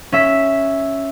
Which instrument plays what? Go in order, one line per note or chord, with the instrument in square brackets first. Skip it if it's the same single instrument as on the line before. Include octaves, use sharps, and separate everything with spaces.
[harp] C#4 E5 B6